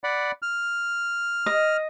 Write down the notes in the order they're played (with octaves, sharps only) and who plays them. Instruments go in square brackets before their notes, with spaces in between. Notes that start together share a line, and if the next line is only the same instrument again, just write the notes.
[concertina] D5 F#5 B5
F6
[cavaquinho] D#5